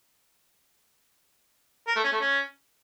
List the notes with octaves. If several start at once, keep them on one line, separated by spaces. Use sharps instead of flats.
A#4
A3
C#4
A3
C#4